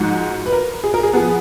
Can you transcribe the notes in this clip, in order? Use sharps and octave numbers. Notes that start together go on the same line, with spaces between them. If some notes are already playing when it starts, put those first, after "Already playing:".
Already playing: G#2 F3 G#3 D#4 F#4
B4
A#4
G#4
A#4
G#4
F3 B3 G#4